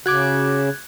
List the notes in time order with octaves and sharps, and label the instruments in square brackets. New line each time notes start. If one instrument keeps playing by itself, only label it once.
[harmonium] C#3 [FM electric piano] F#4 D6 [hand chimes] F#6 G#6